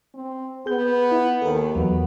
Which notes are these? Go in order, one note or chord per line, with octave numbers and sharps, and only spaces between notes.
C4
B3 G#4 G6
E4
D#2 A4 A#4
E2 F#3 B3